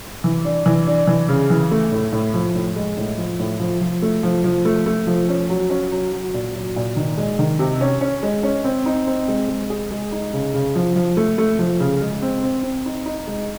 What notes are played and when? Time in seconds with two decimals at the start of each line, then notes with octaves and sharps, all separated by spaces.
0.24 E3
0.45 D4
0.66 E3
0.87 D4
1.07 E3
1.29 C#3
1.50 E3
1.71 A3
1.92 A2
2.12 A2
2.34 F3
2.55 A2
2.76 G#3
2.97 A2
3.18 F3
3.39 A2
3.60 F3
3.81 F3
4.02 A3
4.23 F3
4.44 F3
4.65 A3
4.86 A3
5.07 F3
5.29 C#4
5.50 F#3
5.70 C#4
5.92 F#3
6.13 F#3
6.34 A#2
6.55 F#3
6.76 A#2
6.96 D#3
7.18 G#3
7.39 D#3
7.59 C3
7.81 C#4
8.01 C#4
8.23 G#3
8.43 C#4
8.64 C4
8.86 D#4
9.07 C4
9.28 G#3
9.48 G#3
9.70 G#4
9.91 G#3
10.12 D#4
10.33 C#3
10.54 C#3
10.76 F3
10.96 F3
11.17 A3
11.38 A3
11.59 F3
11.80 C#3
12.01 G#3
12.22 C4
12.43 C4
12.64 C4
12.85 D#4
13.06 D#4
13.27 G#3